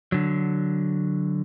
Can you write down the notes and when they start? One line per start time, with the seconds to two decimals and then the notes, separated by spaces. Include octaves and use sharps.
0.12 D3 F#3